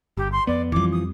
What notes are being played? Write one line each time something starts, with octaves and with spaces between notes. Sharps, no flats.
G1 G4
C6
F2 B3 D5
F2 E3 F3 G3 D6
D#6